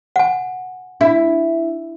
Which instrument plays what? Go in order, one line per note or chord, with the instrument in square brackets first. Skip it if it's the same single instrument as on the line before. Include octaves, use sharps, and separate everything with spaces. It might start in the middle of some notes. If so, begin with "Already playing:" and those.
[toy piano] F#5 G#5
[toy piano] D4 [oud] E4